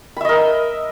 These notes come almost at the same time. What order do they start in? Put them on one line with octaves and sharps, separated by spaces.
B5 E5 D#5 A#4